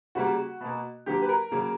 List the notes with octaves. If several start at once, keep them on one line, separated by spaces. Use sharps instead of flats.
C#3 G3 A#3 F#4
B2 A#3
D3 F#3 A#3 G4
B4
A#4
C#3 F#3 A#3